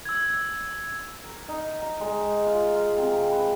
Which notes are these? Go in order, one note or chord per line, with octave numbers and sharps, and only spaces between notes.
E6 G#6
A#4
D#4
A#5
G#3
F4
F5
C3
B4